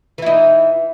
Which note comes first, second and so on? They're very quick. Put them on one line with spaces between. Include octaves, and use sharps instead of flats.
E3 E4 D#4